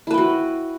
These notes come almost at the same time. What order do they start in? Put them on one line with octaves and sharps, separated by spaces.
E4 B4 G5 F#4